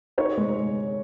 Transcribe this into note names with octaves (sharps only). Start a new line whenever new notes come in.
D#4 C#5
G#3